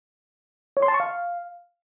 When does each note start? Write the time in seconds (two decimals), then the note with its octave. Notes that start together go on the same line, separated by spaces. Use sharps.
0.77 C#5
0.82 C6
0.88 A5
0.94 C#6
1.00 F5